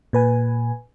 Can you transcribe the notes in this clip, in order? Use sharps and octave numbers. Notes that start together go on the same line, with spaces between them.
A#2 B4 G#5